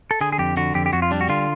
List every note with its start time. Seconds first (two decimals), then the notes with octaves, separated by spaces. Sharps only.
0.11 A4
0.21 D3 G#4
0.33 G#4
0.38 F2 G4
0.57 D3 F#4
0.74 F2 G4
0.86 G4
0.93 F2 F#4
1.02 F4
1.11 G3 D4
1.21 F#4
1.29 D3 F4